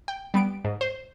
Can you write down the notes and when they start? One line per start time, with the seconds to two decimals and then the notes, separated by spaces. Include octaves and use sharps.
0.08 G5
0.34 G3 B3 D7
0.64 G#2
0.81 C5